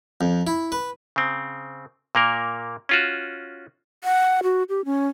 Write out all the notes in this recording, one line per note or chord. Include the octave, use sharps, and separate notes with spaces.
F2
E4
B4
C#3 C4
A#2 A#3 A#4
C#4 F4 F#4
F#5
F#4
G4
C#4